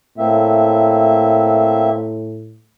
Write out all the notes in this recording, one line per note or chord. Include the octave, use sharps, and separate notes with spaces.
A2 A#3 C4 E5